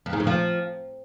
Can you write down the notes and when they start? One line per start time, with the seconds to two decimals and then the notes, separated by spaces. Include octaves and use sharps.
0.06 F2
0.13 G#2
0.20 F2
0.27 F3